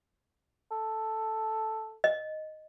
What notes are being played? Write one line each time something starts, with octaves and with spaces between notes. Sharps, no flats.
A4
D#5